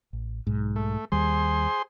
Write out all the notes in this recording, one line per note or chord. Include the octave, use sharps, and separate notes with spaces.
A1
B1 G#2
A3
D#2 D#3 G3 G#4 C5 C6